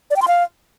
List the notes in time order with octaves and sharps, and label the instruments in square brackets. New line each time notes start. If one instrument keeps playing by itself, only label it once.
[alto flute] D5
G5
C6
F5